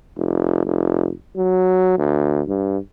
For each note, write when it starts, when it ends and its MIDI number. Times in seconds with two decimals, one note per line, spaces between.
0.17 0.62 29
0.66 1.11 29
1.37 1.97 54
1.98 2.42 38
2.48 2.78 43